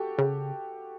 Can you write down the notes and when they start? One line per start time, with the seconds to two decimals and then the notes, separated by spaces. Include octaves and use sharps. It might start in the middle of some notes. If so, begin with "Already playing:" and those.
Already playing: F#4 G4 A4
0.18 C#3